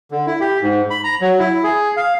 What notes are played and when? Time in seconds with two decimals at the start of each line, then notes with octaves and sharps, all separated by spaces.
0.11 D3
0.27 E4
0.41 G4
0.62 G#2
0.90 B5
1.04 A#5
1.21 F#3
1.39 E4
1.64 G#4
1.97 F5